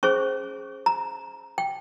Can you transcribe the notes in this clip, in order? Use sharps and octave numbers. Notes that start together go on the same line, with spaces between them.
C#4 G#4 C5 C#6
A#5
G5